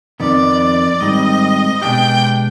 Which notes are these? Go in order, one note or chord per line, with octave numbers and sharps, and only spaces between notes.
F2 D#3 B3 D5
G#2 D#3 G3 C4 D#5
B2 G#3 D4 G4 G5